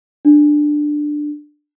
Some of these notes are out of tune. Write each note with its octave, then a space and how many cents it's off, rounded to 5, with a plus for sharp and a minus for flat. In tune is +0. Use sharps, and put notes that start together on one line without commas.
D4 +10